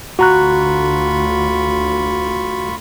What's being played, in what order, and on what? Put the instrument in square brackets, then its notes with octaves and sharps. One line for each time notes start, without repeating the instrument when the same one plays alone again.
[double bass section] D2 D3 [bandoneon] F4 B5 C#6 [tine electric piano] F#4 A#5 F#6